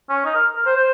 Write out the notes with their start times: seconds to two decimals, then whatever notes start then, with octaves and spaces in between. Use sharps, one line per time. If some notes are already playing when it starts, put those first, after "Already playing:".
0.09 C#4
0.25 D#4
0.35 A#4
0.56 A#4
0.66 C5
0.76 C5